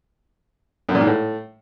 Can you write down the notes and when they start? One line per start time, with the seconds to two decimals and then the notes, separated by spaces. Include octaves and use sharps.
0.89 F#2
0.95 A#2
1.01 G#2
1.07 A2